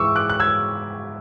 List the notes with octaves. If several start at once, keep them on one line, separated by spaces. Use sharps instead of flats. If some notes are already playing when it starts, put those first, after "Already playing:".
Already playing: G#2 E3 G#3 C#6 D6 E6
D6 F#6
F#6
E6 G#6